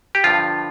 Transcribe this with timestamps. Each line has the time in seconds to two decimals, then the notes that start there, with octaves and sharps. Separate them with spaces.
0.15 G4
0.24 G2 D3 F3 F4